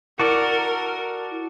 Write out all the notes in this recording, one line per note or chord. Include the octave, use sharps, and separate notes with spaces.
E4 F#4 A4 A#4 D5